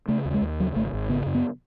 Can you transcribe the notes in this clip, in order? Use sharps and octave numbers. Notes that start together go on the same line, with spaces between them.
C#3 A3
D#2
G#3
D#2
C#3 F#3
G#1 A3
G#1
C#3 B3
F#2
B3